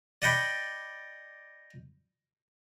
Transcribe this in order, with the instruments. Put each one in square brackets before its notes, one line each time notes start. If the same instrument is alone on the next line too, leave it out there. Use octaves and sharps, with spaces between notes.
[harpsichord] D5 D#5 F#5 G5 B5